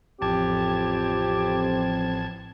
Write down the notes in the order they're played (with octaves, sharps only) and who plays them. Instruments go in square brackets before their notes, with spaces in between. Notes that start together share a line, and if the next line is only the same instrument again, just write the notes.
[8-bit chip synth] A1 A5 G#6 [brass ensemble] F2 C4 [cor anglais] G4